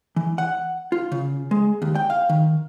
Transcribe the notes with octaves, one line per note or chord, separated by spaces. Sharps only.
E3
F#5
F4
C#3
G#3
D#2
G5
F5
D#3